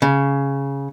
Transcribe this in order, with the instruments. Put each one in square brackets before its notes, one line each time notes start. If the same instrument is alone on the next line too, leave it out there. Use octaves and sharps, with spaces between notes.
[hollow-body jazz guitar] C#3